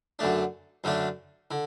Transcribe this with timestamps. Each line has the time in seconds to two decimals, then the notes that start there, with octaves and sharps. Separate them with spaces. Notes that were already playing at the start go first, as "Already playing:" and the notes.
0.19 F#2 D3 A3 D4
0.84 F#2 D3 A3 D4
1.51 D3